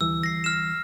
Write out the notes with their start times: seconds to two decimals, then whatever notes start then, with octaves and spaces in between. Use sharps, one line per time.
0.01 D2 E3 G3 E6
0.23 A#6 C7
0.44 F6 E7